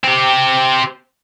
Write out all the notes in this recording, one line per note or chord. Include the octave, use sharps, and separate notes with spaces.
C4 G4